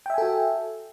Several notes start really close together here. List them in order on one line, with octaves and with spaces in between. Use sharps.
G5 E5 G#5 A4 F#4